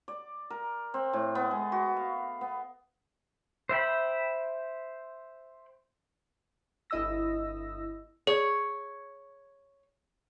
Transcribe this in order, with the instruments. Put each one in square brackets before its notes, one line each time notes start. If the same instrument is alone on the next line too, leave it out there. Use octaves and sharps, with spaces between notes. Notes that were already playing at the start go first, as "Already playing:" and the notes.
[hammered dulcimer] D5
A#4
C4
A2
B3
G#3
F#4
F5
B3
[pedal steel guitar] C5 E5 G5 B5
[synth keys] G1 E4 D#5 D#6 E6 A#6
[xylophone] G#4 [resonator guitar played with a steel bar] C#5